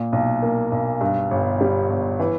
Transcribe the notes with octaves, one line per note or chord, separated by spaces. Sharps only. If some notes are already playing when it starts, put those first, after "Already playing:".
Already playing: A#2
B1
A#3
B1
G2
G1
G3
G1
E3